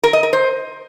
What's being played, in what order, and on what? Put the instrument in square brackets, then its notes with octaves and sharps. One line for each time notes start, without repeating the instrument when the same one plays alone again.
[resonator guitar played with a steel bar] A#4
D#5
A#4
C5